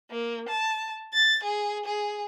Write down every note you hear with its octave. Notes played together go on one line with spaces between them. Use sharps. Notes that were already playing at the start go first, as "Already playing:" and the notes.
A#3
A5
A6
G#4
G#4